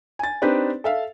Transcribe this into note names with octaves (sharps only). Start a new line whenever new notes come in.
G#5 A6
C4 D4 D#4 G4 B4 D5
A4 E5 F5